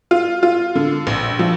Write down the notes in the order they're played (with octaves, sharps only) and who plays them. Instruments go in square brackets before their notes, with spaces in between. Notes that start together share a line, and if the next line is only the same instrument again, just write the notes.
[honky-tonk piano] F4
F4
D3
A#1
F3